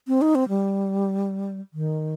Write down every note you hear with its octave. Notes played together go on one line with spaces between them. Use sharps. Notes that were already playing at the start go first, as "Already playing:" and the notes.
C4
D#4
C4
G3
D#3